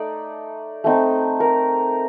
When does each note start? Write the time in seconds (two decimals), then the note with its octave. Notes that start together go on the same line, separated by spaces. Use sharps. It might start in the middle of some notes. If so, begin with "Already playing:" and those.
Already playing: A3 D#4 D5
0.84 A3 C4 D#4
1.40 A#4